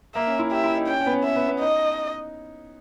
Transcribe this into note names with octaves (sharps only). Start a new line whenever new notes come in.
A#3 E5
C#4
E4
G4 E5
E4
D#4
C#4 G5
C#4
B3
C#4
B3 E5
B3
B3
D#4 D#5